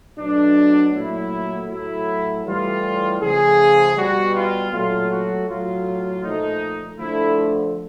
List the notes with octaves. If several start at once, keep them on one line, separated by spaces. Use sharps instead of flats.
B2 F#3 A3 D4
A#2 F#3 A3 E4
A2 F#3 A3 E4
A2 E3 G3 F4
C#3 F3 A3 G#4
B2 G3 F#4
F4
A#2 F#3 A3 F4
F#4
A2 F#3 A3 F4
A#2 F3 A3 D#4
D3 F3 A3 E4